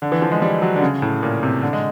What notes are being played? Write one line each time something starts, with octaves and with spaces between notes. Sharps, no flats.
D3
E3
F3
G#3
G3
F#3
D3
C#3
A2
A#2
C3
D3
G#3